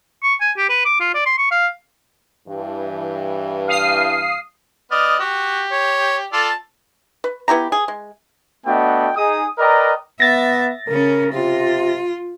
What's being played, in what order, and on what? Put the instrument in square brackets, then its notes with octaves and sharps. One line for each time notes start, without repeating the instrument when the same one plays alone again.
[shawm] C#6
G#5
G4
B4
D6
F4
D5
C6
C#6
F5
[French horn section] G2 E3
[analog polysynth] F5 D#6 C7
[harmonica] B3 D#5 F6 [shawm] D5
[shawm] F#4 [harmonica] G4
[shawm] C#5
[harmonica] F4 A4 D5 [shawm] A5
[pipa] B4
B3 E4 G4 A#5
G#4
G#3
[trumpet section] A3 B3 D4 F#4 D#5 G5
D#4 G#4 D#6
A#4 B4 D5 D#5 G5 A#5
[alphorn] B3 [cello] E5 [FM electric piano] A6 A#6
[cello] C#3 C#4 [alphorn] A#4
[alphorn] C3 [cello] F4